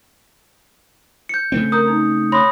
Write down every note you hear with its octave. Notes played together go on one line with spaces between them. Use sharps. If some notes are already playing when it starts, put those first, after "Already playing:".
G6 C#7
C#3 A3 C4
A#4 A#5 D#6 G6
D#4
C#5 B5 C6 D#6 A#6